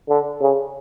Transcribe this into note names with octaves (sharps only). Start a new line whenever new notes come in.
D3
C#3